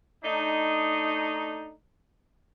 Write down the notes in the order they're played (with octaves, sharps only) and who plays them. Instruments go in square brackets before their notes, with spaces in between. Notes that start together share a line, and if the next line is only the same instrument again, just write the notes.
[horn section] A3 D4 D#4